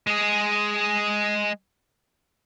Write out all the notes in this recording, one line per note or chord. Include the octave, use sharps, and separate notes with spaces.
G#3 G#4